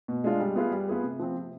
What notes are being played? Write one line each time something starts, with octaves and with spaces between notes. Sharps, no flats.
B2
G#3 D4 F4
G3
B3 F4 G#4 B4
G3
B3 F4 G#4 B4
C3
F3 C4
C3